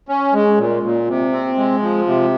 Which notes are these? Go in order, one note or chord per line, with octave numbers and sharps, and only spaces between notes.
C#4
G#3
A#2
A#2
C3
C4
G#3
F3
C3